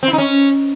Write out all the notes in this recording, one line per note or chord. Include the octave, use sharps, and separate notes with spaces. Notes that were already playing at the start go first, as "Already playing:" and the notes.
C4
E4
D#4
C#4